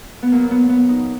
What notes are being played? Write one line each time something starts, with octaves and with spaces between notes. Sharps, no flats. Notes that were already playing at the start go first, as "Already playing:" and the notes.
B3
A#2 F#3 A#3
B3
B3
D#4